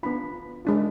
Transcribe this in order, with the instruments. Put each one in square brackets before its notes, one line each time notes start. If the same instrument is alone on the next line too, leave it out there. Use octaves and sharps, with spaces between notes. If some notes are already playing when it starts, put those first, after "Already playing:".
[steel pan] B3 D4 F4 B5
G#3 D4 F4